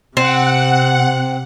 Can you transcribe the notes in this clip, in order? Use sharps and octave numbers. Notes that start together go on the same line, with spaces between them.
C3 C4 F#5